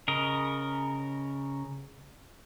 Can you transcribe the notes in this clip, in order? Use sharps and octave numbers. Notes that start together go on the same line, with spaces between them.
C#3 A#4 D#5